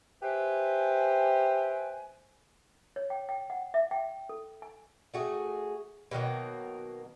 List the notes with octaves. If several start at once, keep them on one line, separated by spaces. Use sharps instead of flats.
G4 B4 C5 E5 G5 G#5
C#5
G5
G5
F#5
E5
G5
A4
G#5
A3 F#4 G#4
B2 D#3 F#3 A#3